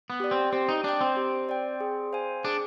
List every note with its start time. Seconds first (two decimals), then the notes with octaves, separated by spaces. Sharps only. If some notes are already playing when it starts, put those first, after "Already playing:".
0.10 B3
0.20 G4 D5
0.31 C4
0.52 C4 G4
0.69 D#4
0.84 D4 D5 G5
1.01 C4
1.17 G4
1.49 D5 G5
1.80 G#4
2.13 C5 F5 G#5
2.44 D4 G#4